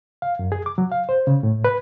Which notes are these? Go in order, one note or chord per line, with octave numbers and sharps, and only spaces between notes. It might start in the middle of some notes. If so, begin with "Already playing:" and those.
F5
F#2
G#4
D6
F#3
F5
C5
C#3
A2
B4